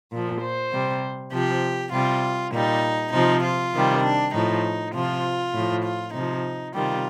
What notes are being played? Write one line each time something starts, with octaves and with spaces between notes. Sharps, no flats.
A#2 F3
C5
C3 G3
C3 F3 G4
C3 G3 F4
A#2 G3 D#4
C3 F3 D#4
F4
C3 D#3 G3
D4
A2 F3 D#4
C3 F3 F4
A2 F3
F4
C3 F3 D#4
C3 D#3 G3 F4